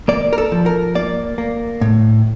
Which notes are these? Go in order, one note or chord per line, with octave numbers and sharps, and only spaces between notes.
A#3 D5
A#4
A4
F3
A#4
A#3 D5
A#3
A2